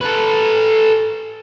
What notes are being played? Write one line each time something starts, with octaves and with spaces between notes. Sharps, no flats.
A4 B4